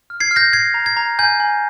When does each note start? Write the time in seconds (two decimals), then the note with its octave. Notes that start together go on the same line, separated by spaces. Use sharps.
0.10 F6
0.20 G#6 C7
0.31 F6
0.36 G6 A#6
0.53 G6 G#6 C7
0.74 A#5
0.86 G#6
0.97 A#5
1.19 G#5 G6
1.40 G#5